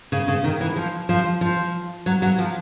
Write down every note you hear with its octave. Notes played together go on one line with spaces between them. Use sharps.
C#3
C#3
D#3
E3
F3
F3
F3
F#3
F#3
F3